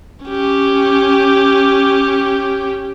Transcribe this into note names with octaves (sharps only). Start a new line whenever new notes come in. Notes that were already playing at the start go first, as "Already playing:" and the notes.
C#4 G4